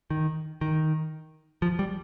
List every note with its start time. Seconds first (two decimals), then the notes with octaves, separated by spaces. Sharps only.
0.10 D#3
0.61 D#3
1.62 F3
1.79 G3